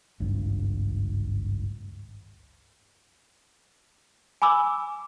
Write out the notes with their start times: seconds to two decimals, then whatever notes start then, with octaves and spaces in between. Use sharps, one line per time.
0.20 G#1 C#2 G2
4.42 G#5 B5 D6 E6